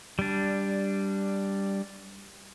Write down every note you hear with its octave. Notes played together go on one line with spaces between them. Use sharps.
G3 D4